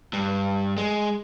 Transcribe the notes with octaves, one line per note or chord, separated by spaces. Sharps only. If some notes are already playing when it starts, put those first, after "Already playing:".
G2
G#3